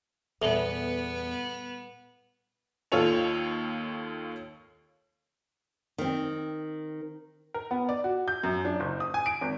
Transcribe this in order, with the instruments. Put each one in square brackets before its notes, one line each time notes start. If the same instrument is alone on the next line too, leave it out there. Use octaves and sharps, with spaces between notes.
[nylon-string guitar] E2 [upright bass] A#2 G3 [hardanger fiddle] B3 [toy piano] A4 E5
[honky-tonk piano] D#2 F4 A4 C#5 F7
[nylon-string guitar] D#3 C4
[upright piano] A#4
B3
D5
F#4
G6
F#2
D4
F#1
D#6
G#5
D7
G#1